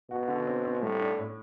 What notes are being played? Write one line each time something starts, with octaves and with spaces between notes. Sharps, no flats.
B2 F#4
D3
C4
C4
A2 G3
D4
A2